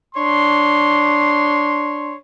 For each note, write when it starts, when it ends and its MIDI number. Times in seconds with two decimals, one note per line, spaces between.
0.15 2.14 62
0.15 2.14 73
0.15 2.14 84